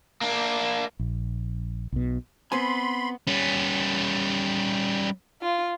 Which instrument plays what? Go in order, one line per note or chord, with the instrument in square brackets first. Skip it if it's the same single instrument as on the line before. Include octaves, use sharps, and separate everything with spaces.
[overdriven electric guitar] A#3 D4
[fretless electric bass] A#1
B1 B2
[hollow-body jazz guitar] B3 C4 G#5 [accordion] B5 C6
[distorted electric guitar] G3 C#4
[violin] F4